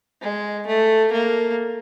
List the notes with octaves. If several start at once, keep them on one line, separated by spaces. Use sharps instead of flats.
G#3
A3
A#3